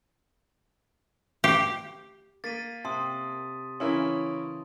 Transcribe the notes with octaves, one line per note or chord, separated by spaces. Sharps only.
G4
A#3 A6 B6 D#7
C3 A5 C6 D#6
C#3 E3 C#4 E4 A#4 C6